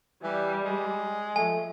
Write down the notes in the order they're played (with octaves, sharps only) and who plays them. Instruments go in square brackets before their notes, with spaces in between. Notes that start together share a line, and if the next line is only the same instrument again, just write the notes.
[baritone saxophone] E3 [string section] G3
[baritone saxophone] G#3
[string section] F3 [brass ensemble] A3 [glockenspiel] G#5